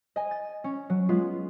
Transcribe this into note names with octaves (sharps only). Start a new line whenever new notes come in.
D#5 G#5
A6
C#4
F#3
G#3 B3 F4